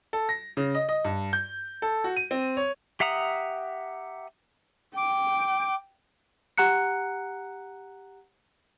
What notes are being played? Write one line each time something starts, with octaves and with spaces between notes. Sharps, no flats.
A4
A#6
C#3
D#5
D#5
G2
G6
A4
F#4
D#7
C4
C#5
G4 E5 F#5 A#5 D#6
G5 D6
G4 F#5 A#5 F#6 C#7